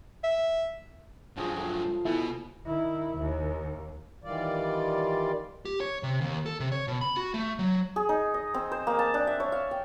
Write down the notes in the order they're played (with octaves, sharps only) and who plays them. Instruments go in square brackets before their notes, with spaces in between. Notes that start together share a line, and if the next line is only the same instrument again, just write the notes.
[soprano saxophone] E5
[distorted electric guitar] G2 F#3 [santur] F3 G#4 D#5
[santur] A3 F5
[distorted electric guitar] B2 [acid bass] E4 [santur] A4 G#5
[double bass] D#3 E4
D#2
[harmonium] D#3 E3 G3 F4 D5
[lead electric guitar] G4
C#5
C3
D#2
A4
C3
C#5
B2
B5
F#4
A3
F#3
[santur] G#4
D#4
D#5
C4
C5
A#3
A5
D4
E5
C#5
F5
G5